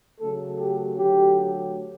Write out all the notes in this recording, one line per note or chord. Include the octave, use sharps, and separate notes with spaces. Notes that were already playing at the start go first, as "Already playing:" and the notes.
C#3 F#3 A3 A4
G4
D3 F#3 A3 G4